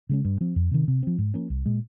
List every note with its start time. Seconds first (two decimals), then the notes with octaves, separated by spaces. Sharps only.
0.09 C#3 G#3 C#4
0.25 G2
0.41 F3 C4
0.56 F2
0.71 C3 D#3
0.88 C3
1.03 F3 C4
1.18 G#2
1.34 F3 A#3 C#4
1.50 C2
1.66 A#2 G#3